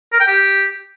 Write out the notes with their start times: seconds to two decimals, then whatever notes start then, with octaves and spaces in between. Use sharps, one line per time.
0.13 A#4
0.20 G5
0.28 G4